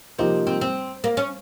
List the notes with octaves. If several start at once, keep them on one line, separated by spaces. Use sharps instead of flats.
C3 F3 A#3 C4 D#4 G4
C4
C4
A#3
C#4